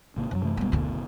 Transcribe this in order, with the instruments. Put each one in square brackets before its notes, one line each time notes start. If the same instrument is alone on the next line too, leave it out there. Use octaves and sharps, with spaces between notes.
[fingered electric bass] G#1 C3 A#3
[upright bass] F#2 [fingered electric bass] E3 F#3
[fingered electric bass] C3 E3 A3
[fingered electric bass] F#1 B2 [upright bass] G3 B3
[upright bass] D2 D3